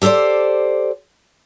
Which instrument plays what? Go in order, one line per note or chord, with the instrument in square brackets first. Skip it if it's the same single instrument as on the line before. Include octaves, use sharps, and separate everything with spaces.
[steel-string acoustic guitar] G4 A4 B4 C5 D5